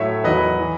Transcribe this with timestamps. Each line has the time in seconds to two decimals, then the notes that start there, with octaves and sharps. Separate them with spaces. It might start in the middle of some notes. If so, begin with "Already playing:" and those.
Already playing: A2 F#3 C#5 E5
0.24 E2 D#3 F#3 B4 D#5
0.59 E3